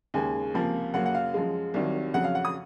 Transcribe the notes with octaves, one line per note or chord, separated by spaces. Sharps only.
D#2 C#3 G#3 G#5
C#2 C3 F3 A#3
F#2 C#3 F#3 A#3 F#5
F#5
F5
F#2 F3 G#3
C2 C3 D#3 F#3
F2 C#3 F#3 F#5
F5
F#5
D#6